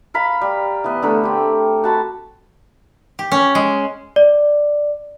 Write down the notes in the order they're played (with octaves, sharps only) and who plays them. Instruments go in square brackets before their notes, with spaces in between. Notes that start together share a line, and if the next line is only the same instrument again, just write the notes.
[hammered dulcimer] A#4 F5 B5
G3
E3 B3
D3 A3 A#4 B5
C4 G4
F#4 A5 B5
[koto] G4
C#4
G#3
[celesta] D5